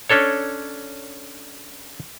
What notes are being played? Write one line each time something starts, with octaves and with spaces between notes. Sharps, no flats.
C#4 D4 A4 C#5